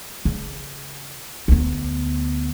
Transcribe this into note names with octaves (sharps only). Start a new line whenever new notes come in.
C#3
D2 B3